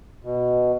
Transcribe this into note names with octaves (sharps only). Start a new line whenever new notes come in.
B2